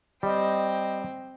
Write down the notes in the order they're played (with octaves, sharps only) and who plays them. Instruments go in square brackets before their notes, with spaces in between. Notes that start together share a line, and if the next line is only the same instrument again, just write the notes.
[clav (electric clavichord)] G3 [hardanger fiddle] C4 G5 [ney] D#5